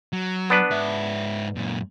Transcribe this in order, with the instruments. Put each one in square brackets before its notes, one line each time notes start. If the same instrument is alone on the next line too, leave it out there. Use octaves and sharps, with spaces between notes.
[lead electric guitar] F#3
[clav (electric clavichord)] B3 D4 B4
[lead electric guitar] G#2 E5
F#2 A#2